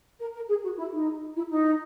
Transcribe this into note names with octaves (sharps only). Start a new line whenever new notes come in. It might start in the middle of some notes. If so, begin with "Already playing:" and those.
A#4
A#4
G#4
F#4
E4
D#4
E4
D#4